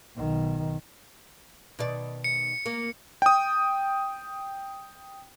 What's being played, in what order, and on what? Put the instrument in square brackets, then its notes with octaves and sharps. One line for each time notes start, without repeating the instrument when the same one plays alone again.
[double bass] B1 D#3
[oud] B2 D#3 D5
[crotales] C#7
[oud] A#3
[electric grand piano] G5 D#6